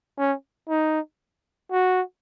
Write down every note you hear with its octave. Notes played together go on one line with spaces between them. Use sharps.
C#4
D#4
F#4